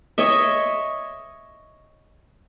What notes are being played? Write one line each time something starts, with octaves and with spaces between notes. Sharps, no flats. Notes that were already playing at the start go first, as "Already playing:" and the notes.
C#5 D#5 E5